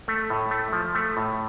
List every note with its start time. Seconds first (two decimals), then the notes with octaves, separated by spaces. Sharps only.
0.08 A3
0.30 A2
0.51 A3
0.73 F3
0.95 A3
1.17 A2